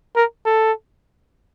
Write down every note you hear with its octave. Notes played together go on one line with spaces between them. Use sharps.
A#4
A4